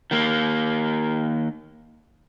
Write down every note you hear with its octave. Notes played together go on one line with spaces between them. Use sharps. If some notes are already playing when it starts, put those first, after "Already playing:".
D#3 A#3